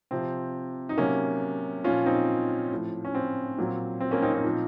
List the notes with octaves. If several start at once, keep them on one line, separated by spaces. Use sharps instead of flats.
C3 F3 C4
D#4
C3 F#3 A#3 C#4
A#2 F3 C#4 F4
C4 D#4
A2 F3
C#4
C4
A#2 F#3
C4
A#3 C#4
C4 D#4
C4 D#4
A#2 F3